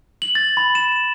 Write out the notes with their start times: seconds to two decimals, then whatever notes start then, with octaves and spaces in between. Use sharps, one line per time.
0.22 F#7
0.35 A6
0.57 B5
0.75 E7